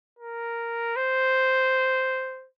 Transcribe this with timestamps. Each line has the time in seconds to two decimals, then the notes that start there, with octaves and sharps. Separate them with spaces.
0.19 A#4
0.96 C5